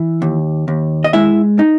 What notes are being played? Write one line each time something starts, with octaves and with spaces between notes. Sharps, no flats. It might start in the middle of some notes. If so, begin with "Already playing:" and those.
Already playing: E3
D#2
D#2
D#5
G#3 E4 E5
D#4